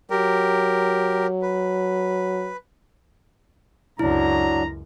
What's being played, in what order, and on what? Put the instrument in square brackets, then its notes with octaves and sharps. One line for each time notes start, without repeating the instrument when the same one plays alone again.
[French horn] F#3 [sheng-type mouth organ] G4 A#4
[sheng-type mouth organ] B4
[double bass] C#2 F#2 [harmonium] F#3 D4 [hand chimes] E4 [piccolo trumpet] A#5